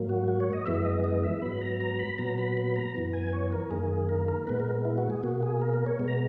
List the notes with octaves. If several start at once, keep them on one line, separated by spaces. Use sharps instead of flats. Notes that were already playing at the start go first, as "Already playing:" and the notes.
Already playing: G#2 F#3 A#3
F#4
F#4
C#5
D#5
F#2 E3 G#3 B3 E5
D#5
D#5
E5
G#2 F#3 B3 B5
A#5
A#5
B5
A#2 F#3 B3 A#5
B5
B5
A#5
F#2 E3 B3
G#5
C#5
A#4
F#2 D#3 A#3 G#4
A#4
A#4
A#2 G#3 B3 B4
A#4
E4
F#4
G#4
B2 A#3 F#4
G#4
A#4
A#4
C#5
B2 G#3 B3
A#5